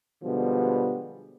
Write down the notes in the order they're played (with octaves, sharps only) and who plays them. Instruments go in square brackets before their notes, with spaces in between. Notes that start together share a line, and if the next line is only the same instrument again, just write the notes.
[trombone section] B2 D3 F3 G3 G#3 B3